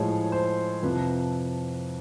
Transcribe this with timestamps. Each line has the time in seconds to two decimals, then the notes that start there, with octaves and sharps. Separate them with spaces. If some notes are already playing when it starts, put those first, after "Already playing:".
Already playing: A2 F3 G#3 C#5
0.32 C5
0.83 F2 C3 F3 B4